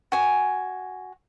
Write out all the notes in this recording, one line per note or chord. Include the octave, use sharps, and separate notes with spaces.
F#4 G#5